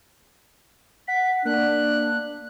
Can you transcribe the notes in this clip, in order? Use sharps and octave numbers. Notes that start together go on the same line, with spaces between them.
F#5 B6
A#3 D4 F#6